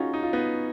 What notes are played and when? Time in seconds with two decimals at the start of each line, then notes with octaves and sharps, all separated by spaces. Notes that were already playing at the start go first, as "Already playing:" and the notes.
Already playing: C#4 D#4 F4 F#4 G#4
0.14 D#4
0.23 F4
0.33 B3 D#4